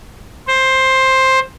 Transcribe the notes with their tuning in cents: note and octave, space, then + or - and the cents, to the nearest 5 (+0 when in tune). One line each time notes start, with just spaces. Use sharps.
C5 +10